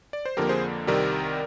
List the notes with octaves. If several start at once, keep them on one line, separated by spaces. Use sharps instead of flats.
D5
C5
F2 D3 F3 A#3 G4 A#4
G#4 C5
C2 C3 D#3 G3 A#4 D5